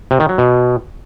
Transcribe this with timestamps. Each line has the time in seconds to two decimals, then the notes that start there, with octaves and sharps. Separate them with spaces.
0.11 C3
0.20 D#3
0.29 F#3
0.38 B2